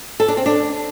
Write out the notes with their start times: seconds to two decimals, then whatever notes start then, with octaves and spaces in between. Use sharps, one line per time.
0.20 A4
0.28 D4
0.37 C4
0.46 D4